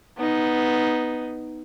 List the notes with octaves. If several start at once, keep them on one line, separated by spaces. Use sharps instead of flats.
B3 D#4